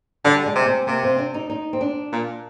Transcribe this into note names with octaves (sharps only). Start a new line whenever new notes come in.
D3 G3
G#3
C3
C4
C3 A#3
C4
D4
D#4
D#4
C4
D4
A#2